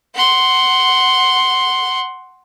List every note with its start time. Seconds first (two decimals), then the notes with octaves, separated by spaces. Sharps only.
0.14 F#5 C6